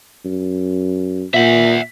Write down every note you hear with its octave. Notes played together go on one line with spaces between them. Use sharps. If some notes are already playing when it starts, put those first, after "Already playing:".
F#2
A#2 E5 F#5